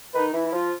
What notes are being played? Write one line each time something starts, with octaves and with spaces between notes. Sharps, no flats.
D#3 D#4 B4
E3 E4
E4
F3 F4